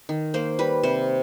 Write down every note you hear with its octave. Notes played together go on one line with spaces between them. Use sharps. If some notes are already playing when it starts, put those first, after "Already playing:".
D#3
A#3 C5
G3 B4
C3 C5